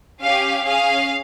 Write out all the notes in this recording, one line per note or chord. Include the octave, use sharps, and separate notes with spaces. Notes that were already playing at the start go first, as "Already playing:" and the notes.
C#4 G4 F5
C#4 G#4 F5